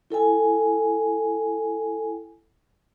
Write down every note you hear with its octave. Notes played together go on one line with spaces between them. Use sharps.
E4 A4 G5 G#5